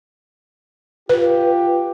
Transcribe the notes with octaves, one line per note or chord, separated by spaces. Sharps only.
F4 G4 B4